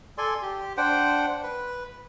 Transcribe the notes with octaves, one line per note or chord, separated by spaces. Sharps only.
A4 D5 G#5 C6
G4
D4 C5 F#5 G5
B4